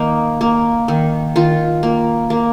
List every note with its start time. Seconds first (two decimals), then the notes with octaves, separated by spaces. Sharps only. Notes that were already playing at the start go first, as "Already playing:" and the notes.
Already playing: D#3 A#3 D#4
0.41 A#3
0.88 D#3
1.36 D#3 F4
1.83 A#3
2.30 A#3